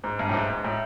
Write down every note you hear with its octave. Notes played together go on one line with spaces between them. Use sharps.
G#2
G2
A2
G#2
G#2
A2